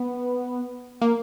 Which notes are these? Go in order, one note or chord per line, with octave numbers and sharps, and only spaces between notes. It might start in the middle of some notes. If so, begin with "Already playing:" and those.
Already playing: B3
A#3